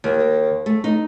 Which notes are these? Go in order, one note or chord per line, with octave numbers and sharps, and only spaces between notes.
D#2
A3
D#4